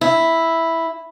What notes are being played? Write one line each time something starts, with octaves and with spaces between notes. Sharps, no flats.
E4